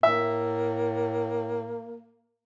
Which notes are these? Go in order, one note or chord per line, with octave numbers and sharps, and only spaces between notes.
A2 A#3 E5